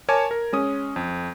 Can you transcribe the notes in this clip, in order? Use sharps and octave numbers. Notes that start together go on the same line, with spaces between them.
A#4 C#5 G#5 A5 D6 G#6
A#4
G#3 C#4 D#6
F2